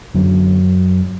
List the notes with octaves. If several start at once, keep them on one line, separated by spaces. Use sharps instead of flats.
F#2 D3 F#3